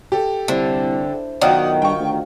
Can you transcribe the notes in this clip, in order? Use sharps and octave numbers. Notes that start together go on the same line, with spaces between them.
G4 A4
C2 D3 D4 E4 C5
B1 D#3 F4 F#4 D5 F#5 D#6
G2 G5 C#6
D2